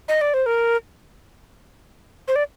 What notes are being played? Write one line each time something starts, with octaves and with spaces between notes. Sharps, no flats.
D#5
D5
C5
A#4
C5
D5